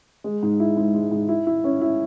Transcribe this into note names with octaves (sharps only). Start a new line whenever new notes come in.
G#3
G#2
E4
G#2
G#3
G#2
E4
E4
C#4
E4